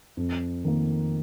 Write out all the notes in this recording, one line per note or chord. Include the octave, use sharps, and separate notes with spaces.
F2
D#3 A#3